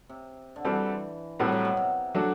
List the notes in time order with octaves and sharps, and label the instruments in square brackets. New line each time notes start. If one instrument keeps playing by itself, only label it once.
[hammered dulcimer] C3
D3
[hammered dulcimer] E3 [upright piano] G3 C4 F#4 A4
[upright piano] A2 G3 C4 F#4 A4 [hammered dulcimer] F#3
[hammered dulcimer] F#3
B2
C3
[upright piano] F#3 A3 D4 F#4